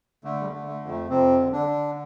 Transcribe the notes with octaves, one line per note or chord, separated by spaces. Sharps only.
D3 A3
G3
A3
D3
A3
F2
A3
F2 C3 C4
D3
D3 D4
D3